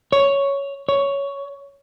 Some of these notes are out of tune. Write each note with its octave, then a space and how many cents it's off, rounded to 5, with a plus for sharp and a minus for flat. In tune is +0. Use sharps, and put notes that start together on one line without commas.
C#5 +5
C#5 +10